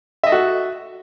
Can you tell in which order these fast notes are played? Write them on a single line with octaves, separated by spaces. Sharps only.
E5 D#5 A4 F#4